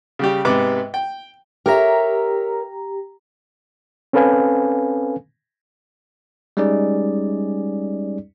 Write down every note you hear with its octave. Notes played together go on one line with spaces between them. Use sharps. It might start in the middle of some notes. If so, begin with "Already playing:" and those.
C#3 G3 G4
G#2 C3 B3 B4 D6
G5
G4 A#4 C#5 E5 A#5
C4 C#4 A4 B4 F5 G#5
G3 G#3 C#4 D#4 G#4 D5